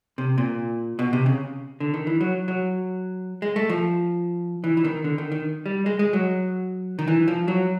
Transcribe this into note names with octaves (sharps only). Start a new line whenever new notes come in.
C3
A#2
B2
C3
C#3
D3
D#3
E3
F#3
F#3
G#3
A3
F3
E3
E3
D#3
D3
D#3
D#3
G3
G#3
G#3
F#3
D#3
E3
F3
F#3